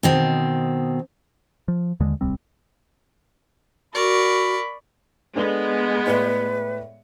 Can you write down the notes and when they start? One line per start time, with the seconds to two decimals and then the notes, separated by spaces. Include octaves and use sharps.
0.03 B2 D#3 C4
1.68 F3
2.00 D#2 D3 G#3
2.21 D1 C2 G3 C4
3.95 F#4 A#4 D5 B5 C#6
5.36 G#3 B3 D4 A4 B4
6.07 A2 B4 D5 C#7